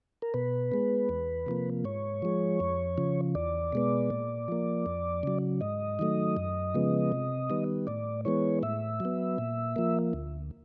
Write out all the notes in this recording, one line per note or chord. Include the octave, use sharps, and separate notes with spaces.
A#4
B2 B4
G#3 B3
E2
C3 F3 A#3
G#2 C#5
F3 G#3
F2
C#3 F3
E2 D5
B2 G#3 B3
A#2
F3 A#3
F2
C#3 F#3
G#2 D#5
D#3 F#3 A3
F#2
C#3 F3 G#3 B3
C3
D#3 G3 B3
A2 D5
E3 G#3 B3 C#5
A2 E5
F#3 B3
A#2
F3 A#3
D2